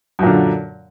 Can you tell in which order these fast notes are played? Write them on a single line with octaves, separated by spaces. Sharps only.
F#2 A#2 D3